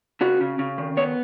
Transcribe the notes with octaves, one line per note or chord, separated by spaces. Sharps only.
C#3 F#4
C#3
C#3
D#3
B3 C#5